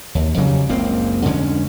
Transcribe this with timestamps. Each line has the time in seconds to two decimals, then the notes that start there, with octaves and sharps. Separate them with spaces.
0.15 D#2
0.38 F2 C#3 F#3 G3
0.69 F#1 C#2 A#3 C4
1.25 F2 D3 G#3 C#4